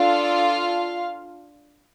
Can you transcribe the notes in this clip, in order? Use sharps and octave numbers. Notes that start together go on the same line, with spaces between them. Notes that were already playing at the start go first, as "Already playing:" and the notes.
Already playing: D4 F4 A4 F5